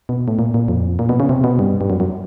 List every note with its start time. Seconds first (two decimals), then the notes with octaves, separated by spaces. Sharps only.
0.09 B2
0.28 A2
0.39 A#2
0.54 A#2
0.68 F2
0.99 A#2
1.09 B2
1.20 C#3
1.29 C3
1.44 B2
1.59 G2
1.81 G2
1.90 F#2
2.00 F#2